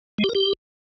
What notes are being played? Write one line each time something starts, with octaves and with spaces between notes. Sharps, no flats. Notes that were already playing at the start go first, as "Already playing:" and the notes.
G#3
G4
A#4
G4